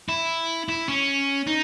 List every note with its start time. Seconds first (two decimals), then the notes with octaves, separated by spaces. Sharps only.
0.09 E4
0.69 E4
0.88 C#4
1.47 D#4